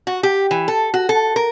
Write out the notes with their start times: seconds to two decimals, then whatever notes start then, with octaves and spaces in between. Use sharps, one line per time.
0.07 F#4
0.23 G4
0.51 E3
0.68 A4
0.94 F#4
1.09 A4
1.36 A#4